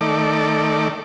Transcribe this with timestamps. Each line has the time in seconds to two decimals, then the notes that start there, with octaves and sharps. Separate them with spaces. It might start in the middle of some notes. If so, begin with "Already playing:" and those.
0.01 D#3 A3 D5